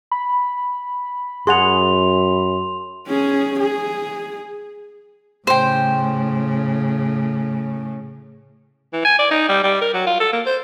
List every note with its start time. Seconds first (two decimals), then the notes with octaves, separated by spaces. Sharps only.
0.11 B5
1.47 F#2 G#4 F#5 C6 F7
3.08 C#4 G#4
3.60 G#4
5.47 A2 C#3 C5 G5
8.93 E3
9.05 G#5
9.19 D5
9.31 D#4
9.49 G3
9.63 G3
9.81 A#4
9.94 F#3
10.06 F4
10.20 A4
10.33 A#3
10.46 C5